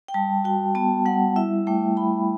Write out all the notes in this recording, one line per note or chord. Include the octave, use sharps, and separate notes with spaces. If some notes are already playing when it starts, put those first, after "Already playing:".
G5
G3 A5
F#4 G5
B3 A5
G3 F#5
E4 E5
A3 G5
E4 B5